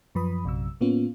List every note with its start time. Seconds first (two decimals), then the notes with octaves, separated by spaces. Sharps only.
0.15 F#2 F3 B4 B5 D#6
0.45 A#1 F#2 C3 F#3 E6
0.81 A2 A#3 B3 C#4 F4